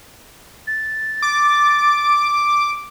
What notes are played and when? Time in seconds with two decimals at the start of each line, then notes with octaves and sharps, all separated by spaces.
0.67 A6
1.22 D6